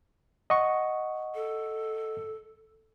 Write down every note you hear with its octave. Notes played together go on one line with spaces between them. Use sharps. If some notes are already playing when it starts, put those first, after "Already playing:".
D#5 F#5 C#6
A4